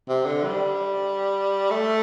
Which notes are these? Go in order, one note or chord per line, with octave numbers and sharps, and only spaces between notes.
C3
D3
G3
A3